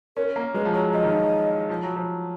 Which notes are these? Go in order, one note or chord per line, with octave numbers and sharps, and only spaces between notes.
C#4 A#4
A#3
G#3 B4
F3
F#3 C#5
F3 D#5
D#3
F3
F3
F#3
F3